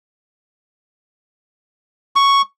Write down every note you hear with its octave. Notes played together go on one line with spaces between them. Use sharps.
C#6